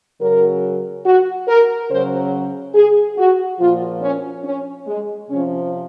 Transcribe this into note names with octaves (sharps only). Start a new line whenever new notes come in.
C#3 F#3 A#4
F#4
A#4
C#3 F#3 C5
G#4
F#4
A#2 F3 F4
C#4
C#4
G#3
C3 F3 C#4